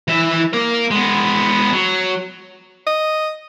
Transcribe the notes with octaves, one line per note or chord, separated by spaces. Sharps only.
E3 E5
A#3 A#4
G#3 B3
F#3
D#5